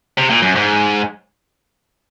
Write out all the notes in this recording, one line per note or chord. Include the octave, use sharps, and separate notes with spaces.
C3
A#2
F#2
G#2